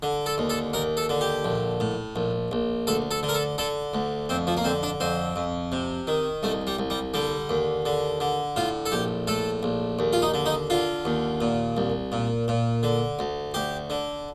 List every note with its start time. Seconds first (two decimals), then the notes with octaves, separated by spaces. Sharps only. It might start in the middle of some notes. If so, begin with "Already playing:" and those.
0.03 D3
0.26 A4
0.38 D#2
0.50 A4
0.73 D#2 A#4
0.97 A4
1.09 D3
1.21 G4
1.44 A#1
1.80 A2
2.16 A#1
2.52 A#1
2.87 D2 A4
3.11 A4
3.23 D3
3.29 A#4
3.34 A4
3.58 D3 A4
3.94 D2
4.29 F2 C4
4.47 F3
4.57 A#3
4.64 D3 C4
4.83 D4
5.00 F2 C4
5.36 F2
5.72 C3
6.07 D#3
6.43 C2 A3
6.67 G3
6.78 C2
6.90 G3
7.14 D3 G3
7.50 D#2
7.85 D3
8.20 D3
8.56 A2 F4
8.86 A4
8.92 A#1 G4
9.27 A2 A4
9.63 A#1
9.99 D#2
10.13 F4
10.22 D#4
10.34 D3
10.46 D#4
10.70 D3 F4
11.05 D#2
11.41 A#2
11.77 C2
12.12 A#2
12.48 A#2
12.83 D3
13.19 D2
13.54 D2 G4
13.90 D3